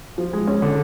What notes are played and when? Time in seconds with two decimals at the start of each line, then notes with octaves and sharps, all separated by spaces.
0.18 F3
0.33 G#3
0.48 C#4
0.62 D3